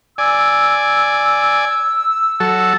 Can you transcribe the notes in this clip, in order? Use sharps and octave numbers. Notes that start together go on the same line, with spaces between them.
D5 G#5 E6
F#3 A4